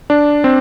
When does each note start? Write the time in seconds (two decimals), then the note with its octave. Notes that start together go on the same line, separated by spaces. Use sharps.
0.10 D4
0.44 C4